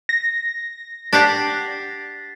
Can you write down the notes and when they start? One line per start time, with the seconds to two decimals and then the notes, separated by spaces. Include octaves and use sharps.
0.09 A#6
1.13 D4 G4 F#5 A6 B6 C7